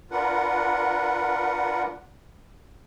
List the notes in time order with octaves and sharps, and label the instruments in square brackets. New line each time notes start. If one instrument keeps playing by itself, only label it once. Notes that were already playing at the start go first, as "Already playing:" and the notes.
[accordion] D4 F4 A#4 B4 F#5